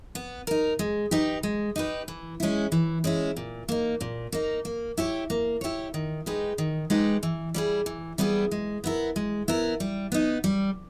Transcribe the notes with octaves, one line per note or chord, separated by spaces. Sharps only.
B3
D#4 A#4
G#3
D#4 G4 B4
G#3
D#4 G4 B4
E3
G#3 C#4 E4
E3
G#3 C#4 E4
A#2
A#3 D#4
A#2
A#3 D#4
A#3
E4 G4 C#5
A#3
E4 G4 C#5
D#3
G#3 D#4 G4 B4
D#3
G#3 D#4 G4 B4
E3
G3 B3 E4 G#4
E3
G3 B3 E4 G#4
G#3
B3 E4 A#4
G#3
B3 E4 A#4
G3
B3 D#4
G3